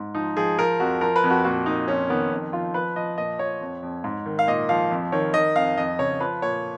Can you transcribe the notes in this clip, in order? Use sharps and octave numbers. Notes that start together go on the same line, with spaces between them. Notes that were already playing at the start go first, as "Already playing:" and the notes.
Already playing: G#2
F3 D#4
F3 G#4
F3 A#4
F2 F#4
F3 A#4
B4
F2
F#4
A#2 F#4
A#2 D#4
F2 C#4
D#3 B3
F2
F3 F4
F3 B4
F3 D#5
A#2 D#5
F3 C#5
F2
F2
G#2
D#3
F5
A#2 D#5
F3 F5
F2
D#3 C#5
D#3 D#5
F2 F5
F2 D#5
C#3 C#5
F3 B4
A#2 C#5